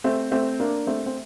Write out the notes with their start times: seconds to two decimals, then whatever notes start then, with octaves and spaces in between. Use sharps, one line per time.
0.04 A3 C4
0.32 A3 C4
0.60 A#3 D4
0.87 A3 C4
1.06 C4